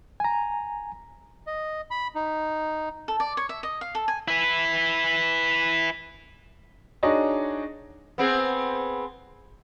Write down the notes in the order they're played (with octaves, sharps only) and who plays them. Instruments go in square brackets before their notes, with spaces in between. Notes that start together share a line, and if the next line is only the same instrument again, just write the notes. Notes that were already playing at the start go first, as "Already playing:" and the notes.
[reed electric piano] G#5 A#5
[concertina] D#5
B5
D#4
[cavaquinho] A4
D5
C#5
E5
D#5
F5
A4
G#5
[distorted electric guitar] E4 B4
[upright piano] D4 D#4 F#4 G#4 C#5 D#5
[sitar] B3 C4 G#4